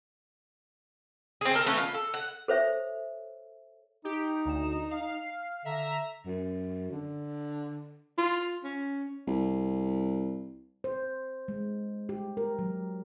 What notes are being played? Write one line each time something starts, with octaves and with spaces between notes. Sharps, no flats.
C4 G#4
A4 A#4
E3 A3 B3 C#4
F4
A4
F#5
A4 C5 C#5 E5
D#4 G4
D2 E7
F5
D3 E5 A#5
F#2
D3
F4
C#4
C2
C5
G#3
G4
A#4
F#3